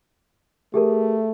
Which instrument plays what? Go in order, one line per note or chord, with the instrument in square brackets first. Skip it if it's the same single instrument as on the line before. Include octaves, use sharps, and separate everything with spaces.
[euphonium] A3 [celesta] G4 G#4 A#4